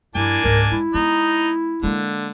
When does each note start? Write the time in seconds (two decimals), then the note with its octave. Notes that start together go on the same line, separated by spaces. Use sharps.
0.15 G2 F3 A#3 D4 E4 G#5
0.44 C#2 G#2 A#4
0.72 G#3 E4
0.94 G#3 B3 D#4
1.83 D3 G#3 A#3